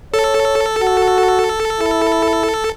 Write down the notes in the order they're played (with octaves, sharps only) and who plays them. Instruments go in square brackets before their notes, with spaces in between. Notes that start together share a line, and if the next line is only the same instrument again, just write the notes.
[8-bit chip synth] A4 [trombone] C#5
[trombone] F#4
E4